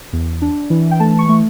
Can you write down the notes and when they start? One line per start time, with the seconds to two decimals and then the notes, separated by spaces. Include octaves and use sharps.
0.13 E2
0.42 D4
0.70 E3
0.91 G5
1.00 A3 A5
1.19 C#6
1.29 A3